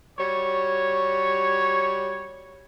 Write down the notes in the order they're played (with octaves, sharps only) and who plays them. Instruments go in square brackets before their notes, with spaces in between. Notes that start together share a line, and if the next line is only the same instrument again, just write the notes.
[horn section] G3 F#4 C#5